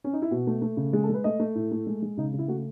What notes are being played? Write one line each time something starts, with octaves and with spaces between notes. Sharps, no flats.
C#4
D#4
E4
B2 F#4
A3
A3
C#3
G#3 G#4
A4
G#3 B4
A3 D#5
A3
A2
A3
G#3
G#3
C#3 D#4
C#3
E4
A3 F#4